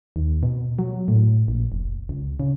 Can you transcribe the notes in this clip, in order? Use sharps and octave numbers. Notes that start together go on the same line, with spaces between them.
D#2
B2
F#3
A2
A#1
F1
C#2
C#3